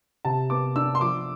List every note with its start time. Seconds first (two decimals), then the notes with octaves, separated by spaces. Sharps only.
0.25 C3 A5
0.50 B3 D6
0.76 D4 E6
0.95 C6
1.01 F3 D6